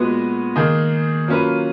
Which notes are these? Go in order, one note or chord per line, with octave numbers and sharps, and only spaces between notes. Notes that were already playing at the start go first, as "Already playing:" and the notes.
Already playing: A#2 G#3 B3 F#4 B4
D#3 A#3 D#4 G#4
F#3 A#3 C#4 F4 B4